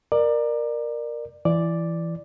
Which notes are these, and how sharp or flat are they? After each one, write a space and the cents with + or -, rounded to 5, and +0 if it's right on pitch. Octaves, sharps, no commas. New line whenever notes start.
A#4 +5 D5 +25
E3 +20 D5 +0